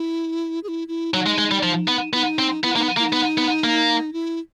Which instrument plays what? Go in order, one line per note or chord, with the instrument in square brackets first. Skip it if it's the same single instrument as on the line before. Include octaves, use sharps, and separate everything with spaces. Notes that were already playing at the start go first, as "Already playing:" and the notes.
Already playing: [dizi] E4
G#4
E4
E4
[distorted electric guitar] F#3 [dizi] D#4
[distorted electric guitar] G#3
G#3
G3
F3
B3
[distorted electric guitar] B3 [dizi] E4
[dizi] D#4
[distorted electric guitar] C4
[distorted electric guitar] B3 [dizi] E4
[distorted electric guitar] A#3 [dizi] D#4
[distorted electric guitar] B3
[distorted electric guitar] A#3 [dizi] E4
[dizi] D#4
[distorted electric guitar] B3
B3
A#3
[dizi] E4